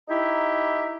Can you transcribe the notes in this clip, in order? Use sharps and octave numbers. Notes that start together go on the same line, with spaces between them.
D#4 E4 G4 E5 A#5